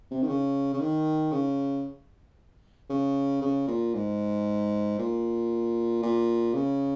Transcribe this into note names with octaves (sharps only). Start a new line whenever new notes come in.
C3
D#3
C#3
C#3
D#3
C#3
C#3
C#3
A#2
G#2
A#2
A#2
C#3